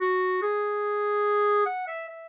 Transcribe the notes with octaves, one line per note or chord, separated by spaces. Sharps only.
F#4
G#4
F#5
E5
E5